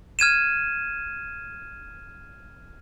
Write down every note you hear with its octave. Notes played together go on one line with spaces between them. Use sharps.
F6 G#6 D#7 E7